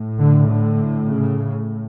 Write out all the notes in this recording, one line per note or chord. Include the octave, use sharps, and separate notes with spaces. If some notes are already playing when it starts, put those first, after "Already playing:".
Already playing: A2
D3
D3
C#3